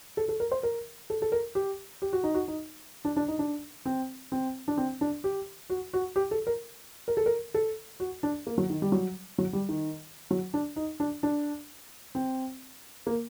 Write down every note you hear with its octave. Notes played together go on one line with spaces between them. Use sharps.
A4
A4
A#4
C5
A#4
A4
A4
A#4
G4
G4
F#4
D#4
F#4
D#4
D4
D4
D#4
D4
C4
C4
D4
C4
D4
G4
F#4
F#4
G4
A4
A#4
A#4
A4
A#4
A4
F#4
D4
A#3
F#3
D#3
G3
F#3
F#3
G3
D#3
F#3
D4
D#4
D4
D4
C4
A#3